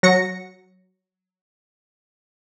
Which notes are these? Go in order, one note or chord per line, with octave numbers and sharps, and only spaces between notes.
F#3 A#6 C#7